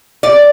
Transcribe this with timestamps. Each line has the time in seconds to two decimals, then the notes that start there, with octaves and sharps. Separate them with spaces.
0.23 D5